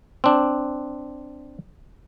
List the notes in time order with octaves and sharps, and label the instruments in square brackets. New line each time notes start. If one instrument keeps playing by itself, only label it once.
[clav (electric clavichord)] C4 D4